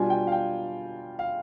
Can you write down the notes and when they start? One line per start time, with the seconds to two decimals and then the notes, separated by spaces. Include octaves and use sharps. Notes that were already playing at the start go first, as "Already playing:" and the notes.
Already playing: B2 G3 D4 F4 G#5
0.10 G5
0.27 F5
0.32 G5
1.19 F5